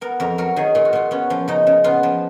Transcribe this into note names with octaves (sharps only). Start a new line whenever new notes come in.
B3 A#4
F2 A#4
F#3 A#4
D#3 G#4
A#2 F4
F#4
A#2 F4
B3 C#4
F3
C#3 D#4
C#3
B3 F4
F3